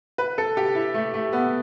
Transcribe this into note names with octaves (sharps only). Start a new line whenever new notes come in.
B4
A4
G4
E4
A3
A3
B3